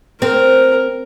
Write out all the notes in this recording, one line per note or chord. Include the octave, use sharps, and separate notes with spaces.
C4 A#4